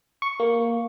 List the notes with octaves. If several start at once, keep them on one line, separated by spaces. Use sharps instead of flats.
C#6
A#3